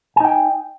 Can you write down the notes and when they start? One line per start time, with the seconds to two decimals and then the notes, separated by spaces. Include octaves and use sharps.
0.16 G#5
0.20 D#4
0.24 G5